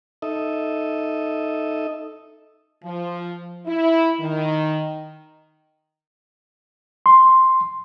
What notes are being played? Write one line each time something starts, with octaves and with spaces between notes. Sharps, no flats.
D#4 A4 D#5 E5
F3
E4
D#3
C6